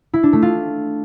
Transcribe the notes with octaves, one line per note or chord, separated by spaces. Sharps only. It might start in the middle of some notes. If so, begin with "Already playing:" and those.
E4
D4
A3
F4